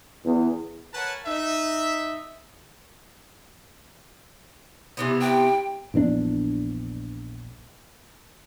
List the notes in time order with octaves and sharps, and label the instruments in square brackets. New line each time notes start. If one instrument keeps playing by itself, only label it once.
[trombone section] E2
[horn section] A#4 B4 C#5 F#5 G#5 A5
D#4 E5
[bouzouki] C3 E3 B3
[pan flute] G5
[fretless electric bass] A#1 E2 C4 D4